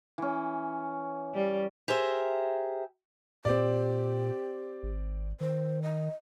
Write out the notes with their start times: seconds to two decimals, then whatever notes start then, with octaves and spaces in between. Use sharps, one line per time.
0.18 E3 C#4
1.34 G3
1.88 G4 G#4 A#4 C5 E5
3.45 A#2 C4 G4 D5
4.83 G#1
5.41 D#3 C5
5.82 D#5